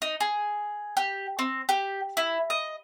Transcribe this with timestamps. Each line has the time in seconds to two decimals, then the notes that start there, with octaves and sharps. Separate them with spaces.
0.02 D#4
0.20 G#4
0.97 G4
1.39 C4
1.69 G4
2.17 E4
2.50 D#5